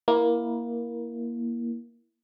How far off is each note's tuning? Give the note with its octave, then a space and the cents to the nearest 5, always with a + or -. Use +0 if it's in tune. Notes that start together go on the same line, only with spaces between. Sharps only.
A#3 +15 E4 +0